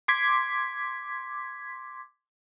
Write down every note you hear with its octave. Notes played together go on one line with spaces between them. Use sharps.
C6 D6 G#6 B6